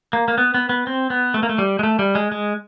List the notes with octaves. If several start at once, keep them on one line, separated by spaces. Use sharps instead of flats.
A#3
A#3
B3
B3
B3
C4
B3
A3
A#3
A3
G3
G#3
A3
G3
G#3
G#3